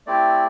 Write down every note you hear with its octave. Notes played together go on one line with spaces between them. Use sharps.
A3 C4 E4 G4 D5